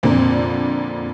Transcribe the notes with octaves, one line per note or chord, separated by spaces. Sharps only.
F2 A#2 D3 A#3 C4